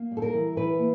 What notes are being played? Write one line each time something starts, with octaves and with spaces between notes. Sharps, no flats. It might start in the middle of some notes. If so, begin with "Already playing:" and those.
Already playing: A#3
G3
A4
A#4
E3
E3 B4
A#3